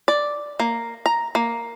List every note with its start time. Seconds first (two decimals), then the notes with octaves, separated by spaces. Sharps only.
0.08 D5
0.60 A#3
1.06 A#5
1.35 A#3